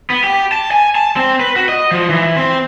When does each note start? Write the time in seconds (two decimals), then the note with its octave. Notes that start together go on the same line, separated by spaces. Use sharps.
0.10 B3
0.24 G4
0.52 A5
0.71 G#5
0.95 A5
1.17 C4
1.40 B4
1.56 F#4
1.69 D#5
1.91 F3
2.10 E3
2.36 C4